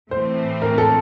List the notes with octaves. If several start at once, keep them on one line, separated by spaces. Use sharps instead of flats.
A2 E3 A3 C4 C5
A#4
A4